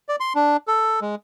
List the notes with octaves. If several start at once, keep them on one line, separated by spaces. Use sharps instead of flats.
D5
C6
D4
A4
G#3